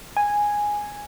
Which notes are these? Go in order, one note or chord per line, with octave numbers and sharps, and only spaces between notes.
G#5